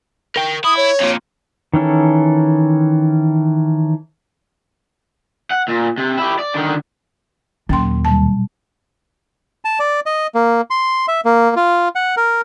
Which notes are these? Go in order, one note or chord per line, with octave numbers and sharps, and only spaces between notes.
A#4 G5
E4 D#6
C#5
F2 A#2
D#3 E3 C#4 A4
F#5
A#2
C3
E4 G4
D5
D3 D#3
D#2 A#2 F#3 C#4 G5 C6
B2 G3 A5
A5
D5
D#5
A#3
C6
E5
A#3
F4
F#5
A#4